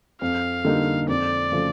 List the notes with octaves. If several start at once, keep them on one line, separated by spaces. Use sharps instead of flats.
F2 F5
D3 G3 A#3 D#4
F2 D5
C#3 F3 A3